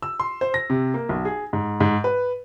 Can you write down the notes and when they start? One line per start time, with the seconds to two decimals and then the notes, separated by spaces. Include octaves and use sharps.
0.02 E6
0.20 C6
0.41 C5
0.54 A#6
0.70 C3
0.94 A#3
1.09 B1
1.25 G#4
1.53 G#2
1.80 G#2
2.04 B4